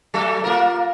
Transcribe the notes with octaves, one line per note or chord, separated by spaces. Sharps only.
F#3 A3 A4
A#3 F4 A#4